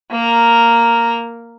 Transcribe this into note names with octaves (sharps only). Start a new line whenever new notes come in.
A#3 A#4